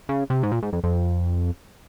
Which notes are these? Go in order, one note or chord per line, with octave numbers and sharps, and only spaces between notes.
C#3
C3
G#2
A#2
G#2
F2
F2